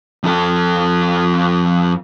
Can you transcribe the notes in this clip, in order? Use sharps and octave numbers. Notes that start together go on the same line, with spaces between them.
F2 A4